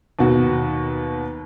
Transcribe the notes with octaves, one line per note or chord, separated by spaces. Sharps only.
D#2 B2 F#4